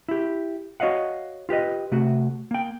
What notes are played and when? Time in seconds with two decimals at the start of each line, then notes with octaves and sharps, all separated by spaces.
0.08 E4 G4
0.80 F#4 C#5 D#5 F5 F#5
1.49 F4 G4 B4 D#5
1.92 C3 A3 F#4
2.51 A#3 G5